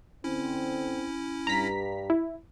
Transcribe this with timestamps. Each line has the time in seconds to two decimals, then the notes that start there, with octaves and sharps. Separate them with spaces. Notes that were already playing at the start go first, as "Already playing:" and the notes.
0.24 D3 C4 C#4 E4
1.47 G2 G3 A#5 B6
2.10 E4